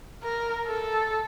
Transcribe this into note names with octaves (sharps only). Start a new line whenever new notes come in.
A#4
A4